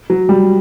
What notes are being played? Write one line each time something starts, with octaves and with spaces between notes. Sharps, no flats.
F#3
G3